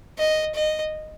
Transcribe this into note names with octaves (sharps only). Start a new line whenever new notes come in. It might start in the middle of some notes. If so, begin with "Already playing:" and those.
D#5
D#5